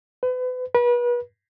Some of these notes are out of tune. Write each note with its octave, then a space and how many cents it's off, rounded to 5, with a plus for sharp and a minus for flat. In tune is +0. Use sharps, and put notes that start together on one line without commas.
B4 +35
B4 -35